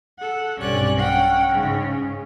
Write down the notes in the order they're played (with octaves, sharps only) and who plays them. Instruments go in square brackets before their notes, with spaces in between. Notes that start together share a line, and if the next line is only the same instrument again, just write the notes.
[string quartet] A4 F#5
[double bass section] B1 G2 C3 [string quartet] C#4 D5 F#6
[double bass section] C#4 [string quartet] F#5 G5
[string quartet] G#2 C#3